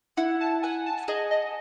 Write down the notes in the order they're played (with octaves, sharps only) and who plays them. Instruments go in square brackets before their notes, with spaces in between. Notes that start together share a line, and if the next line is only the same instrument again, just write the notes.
[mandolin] E4 [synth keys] F#5
[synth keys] A5
[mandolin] F#5 [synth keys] G#5
[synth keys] A5
[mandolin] G#4 [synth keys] D#5
[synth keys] D#5